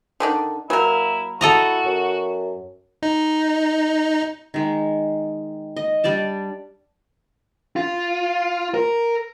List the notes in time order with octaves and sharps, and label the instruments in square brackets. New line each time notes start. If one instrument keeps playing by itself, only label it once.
[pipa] D3 D#3 D4
[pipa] F#3 A#4 [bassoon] A#3 [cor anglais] E4
[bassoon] E4 [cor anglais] F#4 [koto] A4 D#5 A#5
[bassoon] F#2
[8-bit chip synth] D#4
[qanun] D#3 G#3
D#5
G3 D4 D5 A5
[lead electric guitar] F4
A#4